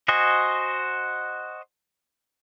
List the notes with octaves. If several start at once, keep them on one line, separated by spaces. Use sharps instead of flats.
F#4 C5 D#5 G#5